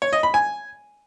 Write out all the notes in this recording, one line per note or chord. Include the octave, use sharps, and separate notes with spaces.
C#5
D#5
B5
G#5